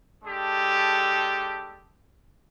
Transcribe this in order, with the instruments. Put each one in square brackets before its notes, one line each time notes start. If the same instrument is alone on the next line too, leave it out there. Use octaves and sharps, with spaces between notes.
[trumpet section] G#3 D4 G4 A4